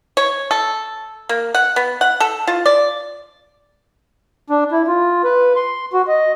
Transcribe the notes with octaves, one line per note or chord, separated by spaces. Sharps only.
C#5
A4
A#3
F#5
B3
F#5
A4
F4
D5
D4
E4
F4
B4
C6
F#4
D#5